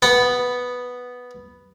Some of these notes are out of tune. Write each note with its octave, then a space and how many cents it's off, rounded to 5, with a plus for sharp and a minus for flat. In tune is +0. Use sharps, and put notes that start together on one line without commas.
B3 +0 F#5 +0